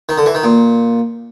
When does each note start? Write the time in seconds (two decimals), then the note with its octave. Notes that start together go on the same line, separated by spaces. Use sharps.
0.09 D#3
0.18 D3
0.26 E3
0.35 D#3
0.44 A#2